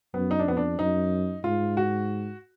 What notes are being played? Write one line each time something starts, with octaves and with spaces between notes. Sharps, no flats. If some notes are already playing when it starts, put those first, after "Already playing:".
F#2 B3
D#4
D4
F2 B3
D4
F#2 D#4
G#2 F4
F#4